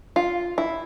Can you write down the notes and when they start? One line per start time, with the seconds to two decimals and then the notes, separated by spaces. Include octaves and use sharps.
0.16 F4
0.58 E4